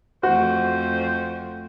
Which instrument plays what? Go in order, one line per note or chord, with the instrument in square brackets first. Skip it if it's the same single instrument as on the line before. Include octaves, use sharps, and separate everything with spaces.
[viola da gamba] F2 A3 [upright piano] F#4 [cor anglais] C5